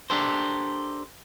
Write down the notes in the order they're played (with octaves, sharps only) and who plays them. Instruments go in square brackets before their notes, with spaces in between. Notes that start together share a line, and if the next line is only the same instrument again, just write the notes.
[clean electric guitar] D4 G4 A4 A#4 C5